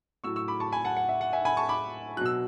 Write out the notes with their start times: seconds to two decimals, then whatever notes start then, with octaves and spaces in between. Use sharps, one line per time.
0.24 A2 F#3 C#6 E6
0.36 C#6 E6
0.48 B5 D6
0.60 A5 C#6
0.72 G#5 B5
0.85 F#5 A5
0.97 F#5
1.09 E5
1.21 F#5
1.33 E5 G#5
1.45 G#5 B5
1.57 A5 C#6
1.69 B5 D6
2.17 F#3 F#6
2.21 B2 E6